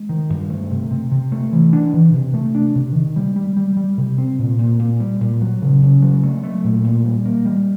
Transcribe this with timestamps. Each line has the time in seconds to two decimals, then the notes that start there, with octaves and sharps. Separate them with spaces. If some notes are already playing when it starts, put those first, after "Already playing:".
Already playing: G#3
0.09 D#3
0.30 G2
0.50 A3
0.70 C3
0.91 C3
1.12 C3
1.32 A3
1.53 E3
1.73 D4
1.93 E3
2.13 C3
2.34 A3
2.55 D4
2.75 C3
2.95 D#3
3.16 G3
3.36 G3
3.57 G3
3.77 G3
3.97 C3
4.18 C4
4.39 A#2
4.59 A#2
4.80 A#2
5.00 G3
5.21 A#2
5.41 F#3
5.62 C#3
5.82 C#3
6.03 F#3
6.24 A3
6.43 A3
6.64 A#2
6.84 A#2
7.05 G3
7.26 A#3
7.45 G3